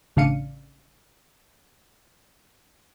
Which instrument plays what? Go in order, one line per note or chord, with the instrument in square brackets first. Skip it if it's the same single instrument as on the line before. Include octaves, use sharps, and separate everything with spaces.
[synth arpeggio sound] A1 C#3 D4 F5 C#7 D#7